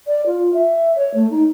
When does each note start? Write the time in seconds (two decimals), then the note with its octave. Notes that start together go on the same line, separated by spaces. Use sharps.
0.07 D5
0.26 F4
0.53 E5
0.95 C#5
1.14 A3
1.30 D#4